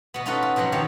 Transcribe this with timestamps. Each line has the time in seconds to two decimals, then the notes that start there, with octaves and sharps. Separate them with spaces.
0.14 B2 B3
0.26 C#4 D#4 F4 F#4 A4 B4
0.42 F4
0.56 B2 F3 F#3 C4 F#5
0.72 D#3 F3 G4 C#5 F5